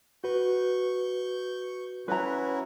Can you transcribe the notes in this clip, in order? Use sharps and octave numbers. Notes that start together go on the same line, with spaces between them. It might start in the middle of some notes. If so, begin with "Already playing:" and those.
F#4 B4 C#6 G6
C#4 E4 F#4 B4 A#5